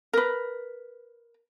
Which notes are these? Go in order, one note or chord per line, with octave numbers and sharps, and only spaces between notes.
A#4 B4